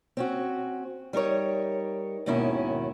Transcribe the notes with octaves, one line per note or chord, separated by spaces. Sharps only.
C4 C#4 F#4
G3 D#4 A#4 C#5
D#2 G#2 B2 D#3 C#4 E4